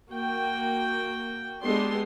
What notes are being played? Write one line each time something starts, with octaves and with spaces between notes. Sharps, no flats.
A#3 F#4 G5
G#3 B3 D4 G4 A4 C6